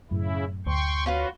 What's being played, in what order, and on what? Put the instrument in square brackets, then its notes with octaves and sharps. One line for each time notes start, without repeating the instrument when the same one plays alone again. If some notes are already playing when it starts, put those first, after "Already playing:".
[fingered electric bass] F#2 A2 [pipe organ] C#3 E4
[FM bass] D2 [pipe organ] G5 C6 C#6
[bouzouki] C#4 F4 B4 [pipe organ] F#4